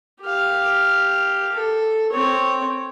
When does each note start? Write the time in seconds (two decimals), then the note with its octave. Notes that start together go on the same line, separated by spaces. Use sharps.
0.22 G4 F5
1.52 A4
2.11 C4 C#5